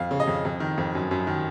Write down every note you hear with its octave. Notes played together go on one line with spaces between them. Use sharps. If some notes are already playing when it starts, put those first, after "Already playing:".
Already playing: F2 F5
C#3
D#5
F2
F2
D#3
F2
F#2
F#2
D#3